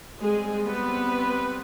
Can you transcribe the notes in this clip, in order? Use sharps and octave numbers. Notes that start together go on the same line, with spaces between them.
G3 G#3 C4 G#4
B3 B4